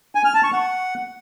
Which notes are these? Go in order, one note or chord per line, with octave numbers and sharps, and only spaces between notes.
G#5
F6
A5
C#6
F#5